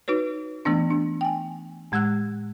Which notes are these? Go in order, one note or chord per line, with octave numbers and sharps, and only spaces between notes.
D#4 F#4 B4 C#5
E3 A3 B3 D4
D4
G5 G#5
A2 G#3 F#5 E6 F#6